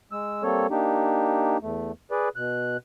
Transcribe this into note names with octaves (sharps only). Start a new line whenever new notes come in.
G#3 E6
G3 A#3 C4 A4 C#5
A#3 D4 D#4 G4
E2 A3
G#4 B4 D5
B2 F#6